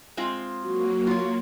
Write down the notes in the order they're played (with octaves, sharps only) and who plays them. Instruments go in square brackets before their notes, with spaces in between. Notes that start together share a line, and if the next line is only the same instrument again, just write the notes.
[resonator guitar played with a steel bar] G#3 C4 F4
[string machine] F#3 A#3 [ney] F#4
[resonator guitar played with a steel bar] F4 C#5